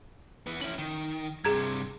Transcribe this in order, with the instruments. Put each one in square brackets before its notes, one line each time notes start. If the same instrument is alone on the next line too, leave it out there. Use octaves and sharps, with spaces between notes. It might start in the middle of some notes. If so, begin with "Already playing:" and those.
[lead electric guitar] E3 B3
[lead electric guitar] C#4 E4 [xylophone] F#7
[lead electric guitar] D#3
[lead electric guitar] G2 C3 [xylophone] G#4 A#5 G#6